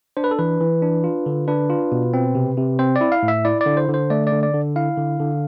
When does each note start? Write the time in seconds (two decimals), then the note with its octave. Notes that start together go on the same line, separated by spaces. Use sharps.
0.17 D4 C5
0.24 B4
0.31 A4
0.39 E3 B4
0.60 E3
0.82 D4
1.04 F4
1.26 D3
1.48 D4 B4
1.70 F4
1.92 B2
2.14 C4
2.35 C3
2.57 C3
2.79 C4 C5
2.96 D5
3.01 E4
3.12 F5
3.23 A2
3.28 E5
3.45 E4 D5
3.61 D5
3.66 D3
3.77 C5
3.88 D3
3.94 C5
4.10 A3 D5
4.27 D5
4.32 D3
4.43 D5
4.54 D3
4.76 E4 F5
4.98 D3
5.20 D3